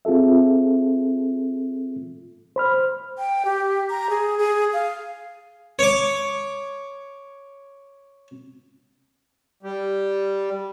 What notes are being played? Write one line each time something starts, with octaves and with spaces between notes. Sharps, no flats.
C4 F4 G#4 A4 E5
C5 B5 F6
G5
G4
A#5
G#4
G#4
F5
C#5 D6
G3